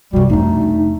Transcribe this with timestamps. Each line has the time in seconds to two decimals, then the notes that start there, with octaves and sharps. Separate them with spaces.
0.13 F#2 C3 G3 F#4
0.29 F2 A3 D4 D#4